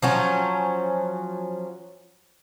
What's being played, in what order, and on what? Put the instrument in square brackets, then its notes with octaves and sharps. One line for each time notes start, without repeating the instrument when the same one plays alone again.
[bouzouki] F3 F#3 C#4